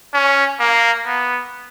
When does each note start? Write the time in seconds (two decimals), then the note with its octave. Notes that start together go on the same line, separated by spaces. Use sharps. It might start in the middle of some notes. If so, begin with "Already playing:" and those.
0.14 C#4
0.60 A#3
1.06 B3